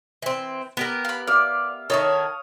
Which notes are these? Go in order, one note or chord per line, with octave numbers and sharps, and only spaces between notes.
E3 C4
B3 G4 A#4
F5 B5
D5 E5 F5
D#3 E4 A4 C#5 F5 C#6 D#6